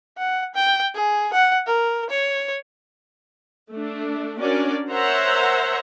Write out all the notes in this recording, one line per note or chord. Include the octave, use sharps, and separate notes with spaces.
F#5
G5
G#4
F#5
A#4
C#5
A3 D4
C#4 D4 F#4 A#4 D5
A#4 C5 C#5 E5 F#5 A#5